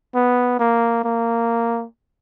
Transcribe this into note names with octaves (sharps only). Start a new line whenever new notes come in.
B3
A#3
A#3